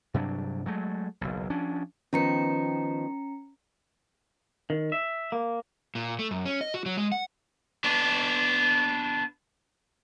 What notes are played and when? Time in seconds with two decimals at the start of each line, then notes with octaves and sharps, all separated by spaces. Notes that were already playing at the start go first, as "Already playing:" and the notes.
0.14 G2 C3 F#3 D4
0.66 F#3 G#3 A3
1.21 F#1 B1
1.50 F3 C#4 D4
2.13 D#3 F3 B3 C#4 A#5 C#7
4.70 D#3
4.92 E5
5.32 A#3
5.95 A#2
6.19 A3
6.31 F#2
6.46 C#4
6.61 D#5
6.74 F#4
6.86 F#3
6.97 G#3
7.12 F#5
7.84 B3 D4